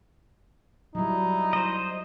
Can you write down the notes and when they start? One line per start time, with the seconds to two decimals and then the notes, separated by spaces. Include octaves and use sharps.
0.95 F#3 G3 D#4 E4
1.53 C5 D#5